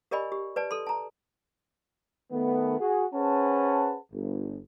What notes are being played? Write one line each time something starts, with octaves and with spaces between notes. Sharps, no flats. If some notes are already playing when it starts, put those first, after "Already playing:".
G4 A#4 D5 D#5 G#5 B5
G4
B4 D5 A5
A4 C6
A5 A#5
D#3 A3 B3
F#4 G#4
C#4 G#4 B4 C5 F#5 A5
G1